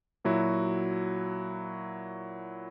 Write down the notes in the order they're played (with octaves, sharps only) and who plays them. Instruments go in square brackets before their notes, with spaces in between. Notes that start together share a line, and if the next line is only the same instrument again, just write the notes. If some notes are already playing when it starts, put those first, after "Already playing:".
[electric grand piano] A#2 F#3 E4 F#4